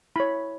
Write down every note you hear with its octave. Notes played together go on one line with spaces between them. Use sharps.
E4 C#5 B5